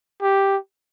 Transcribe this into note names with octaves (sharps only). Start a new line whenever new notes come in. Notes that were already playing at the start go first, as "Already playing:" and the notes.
G4